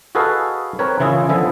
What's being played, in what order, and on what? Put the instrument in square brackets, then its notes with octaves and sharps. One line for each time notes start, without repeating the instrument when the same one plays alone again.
[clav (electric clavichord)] F#4 G#4 A4 B4 D#5 F5
C4 A#4 B4 C#5
C#3 E3 E4 F4 G#4
D3 F3 B3 E5 G#5